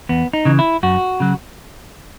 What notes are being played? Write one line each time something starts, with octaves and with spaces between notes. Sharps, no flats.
E2 B3
D#4
C#3 E3
E4
F#2 F#4
C#3 F#3